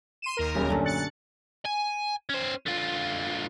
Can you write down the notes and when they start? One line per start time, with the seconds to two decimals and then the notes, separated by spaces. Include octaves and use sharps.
0.22 C6 D#7 E7
0.37 D#2 A#4
0.55 D#1 B1 C#3 G4
0.69 F#2 A#2 D3 A3 C#4
0.85 F#6 A6 C#7
1.65 G#5
2.29 C#4 C5
2.66 D3 F4